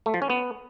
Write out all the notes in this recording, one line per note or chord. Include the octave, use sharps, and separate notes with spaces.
A3
F3
C#4
B3